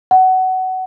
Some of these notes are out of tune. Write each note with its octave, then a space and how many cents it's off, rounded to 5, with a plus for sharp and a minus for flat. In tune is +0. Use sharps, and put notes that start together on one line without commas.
F#5 +20